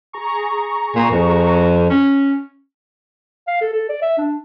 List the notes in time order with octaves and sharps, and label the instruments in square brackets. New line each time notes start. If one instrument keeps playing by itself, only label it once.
[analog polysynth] G#4 A#5 C#6
[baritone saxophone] A#2
F2
C#4
[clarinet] F5
A4
A4
D5
E5
D4